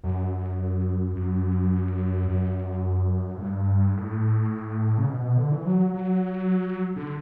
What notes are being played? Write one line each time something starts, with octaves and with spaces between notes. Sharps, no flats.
F#2
F#2
F#2
A2
G2
A2
C#3
B2
B2
D3
E3
F#3
F#3
D3